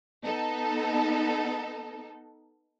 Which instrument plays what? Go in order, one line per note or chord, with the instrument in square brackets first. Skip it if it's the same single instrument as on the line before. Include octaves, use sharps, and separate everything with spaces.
[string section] B3 D#4 A4